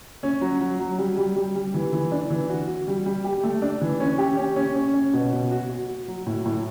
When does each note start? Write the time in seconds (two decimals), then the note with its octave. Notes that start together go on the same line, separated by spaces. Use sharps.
0.23 C#4
0.41 F#3
0.61 F#3
0.80 F#3
0.98 G3
1.17 G3
1.36 G3
1.56 G3
1.74 E3
1.93 E3
2.12 D4
2.30 E3
2.50 F#4
2.68 F#4
2.88 G3
3.06 G3
3.25 G4
3.43 A3
3.62 D4
3.81 E3
4.00 C#4
4.18 G4
4.37 C#4
4.56 C#4
4.76 C#4
4.94 C#4
5.13 B2
5.32 B2
5.51 F#4
5.70 F#4
5.88 F#4
6.08 F#3
6.27 A2
6.46 A2